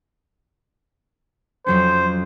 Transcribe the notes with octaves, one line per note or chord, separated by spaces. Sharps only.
F2 F#3 C#4 C5